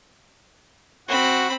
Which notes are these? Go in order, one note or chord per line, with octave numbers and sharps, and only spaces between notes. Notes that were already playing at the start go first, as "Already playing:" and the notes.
C4 F#4 B5